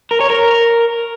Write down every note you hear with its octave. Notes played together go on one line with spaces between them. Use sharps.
A#4
C#5
A#4